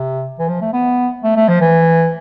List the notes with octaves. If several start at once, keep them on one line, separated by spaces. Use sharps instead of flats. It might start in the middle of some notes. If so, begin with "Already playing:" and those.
Already playing: C3
E3
F3
A3
B3
A3
A3
F3
E3